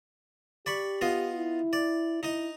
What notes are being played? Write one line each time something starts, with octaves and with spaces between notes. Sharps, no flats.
G4 D5 B5 C#6
B3 F4 D#5
E4
D5
D#4 E4 D#5